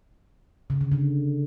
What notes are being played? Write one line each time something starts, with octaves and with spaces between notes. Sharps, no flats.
C#3
D3
D3